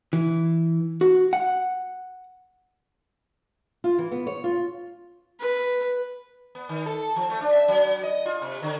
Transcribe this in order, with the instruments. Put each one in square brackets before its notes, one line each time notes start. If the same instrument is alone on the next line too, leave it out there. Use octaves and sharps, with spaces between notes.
[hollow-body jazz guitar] E3
F#4
F#5
[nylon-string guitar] F4
E3
B3
C#5
F4
[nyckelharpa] B4
[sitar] B3
D#3
A4
F3
A3
D4
E5
F#3
D#5
F4
C3
D3